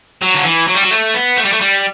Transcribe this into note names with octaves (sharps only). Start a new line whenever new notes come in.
F#3
D3
E3
F#3
G3
F#3
A3
B3
A3
G3
A3
G3